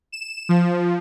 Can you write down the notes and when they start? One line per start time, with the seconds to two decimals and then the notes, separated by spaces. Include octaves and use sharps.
0.12 E7
0.49 F3